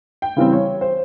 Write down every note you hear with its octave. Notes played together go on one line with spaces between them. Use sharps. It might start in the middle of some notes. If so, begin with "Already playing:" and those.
G5
C#3 E3 G3 C4
C#5
C5